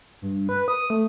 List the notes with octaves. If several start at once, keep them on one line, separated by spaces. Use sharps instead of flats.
G2
B4
D#6
A3